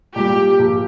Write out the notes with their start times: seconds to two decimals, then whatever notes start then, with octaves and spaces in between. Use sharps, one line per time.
0.16 A#2 G3 G4
0.59 A#1